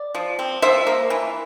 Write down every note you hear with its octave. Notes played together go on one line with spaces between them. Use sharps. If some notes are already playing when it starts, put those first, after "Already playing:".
Already playing: D5
F3
C4
F3 C5 E5
A#3
E3